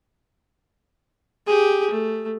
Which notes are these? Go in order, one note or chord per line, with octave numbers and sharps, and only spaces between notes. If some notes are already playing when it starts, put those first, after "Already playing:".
G4 G#4
A3